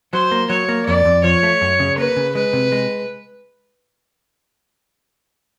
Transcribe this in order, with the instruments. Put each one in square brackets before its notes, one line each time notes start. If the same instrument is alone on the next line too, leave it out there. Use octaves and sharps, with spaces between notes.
[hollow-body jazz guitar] F#3 [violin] C5
[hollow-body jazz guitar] A#3
[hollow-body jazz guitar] F#3 [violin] C#5
[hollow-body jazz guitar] A#3
[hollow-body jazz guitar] F2 [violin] D5
[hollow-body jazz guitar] F2
[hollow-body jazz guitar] F3 [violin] C#5
[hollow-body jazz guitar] A3
F#2
C#3
[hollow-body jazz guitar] A#3 [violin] B4
[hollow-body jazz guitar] C#3
[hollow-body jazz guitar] G#3 [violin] B4
[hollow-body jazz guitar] C3
G#3